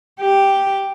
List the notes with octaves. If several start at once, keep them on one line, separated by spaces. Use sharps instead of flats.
G4